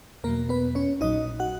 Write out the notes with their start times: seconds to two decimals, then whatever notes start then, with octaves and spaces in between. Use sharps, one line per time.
0.24 E2 B2 F#3 A#3 A#4
0.49 B3 B4
0.75 C#4 C#5
1.01 A#1 A#2 F#3 D#4 D#5
1.40 F#4 F#5